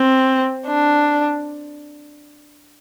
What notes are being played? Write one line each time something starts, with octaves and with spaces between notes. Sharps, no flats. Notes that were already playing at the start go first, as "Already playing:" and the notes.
Already playing: C4
D4